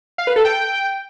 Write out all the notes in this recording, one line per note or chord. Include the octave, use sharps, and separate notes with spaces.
F5
B4
A4
G5